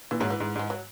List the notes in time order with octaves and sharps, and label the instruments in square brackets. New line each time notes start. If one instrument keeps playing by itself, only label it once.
[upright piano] A#2 [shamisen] E3
[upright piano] G#2 [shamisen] F#3
[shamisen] E3
[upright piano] G#2
[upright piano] G#2 [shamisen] G#3
[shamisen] F#3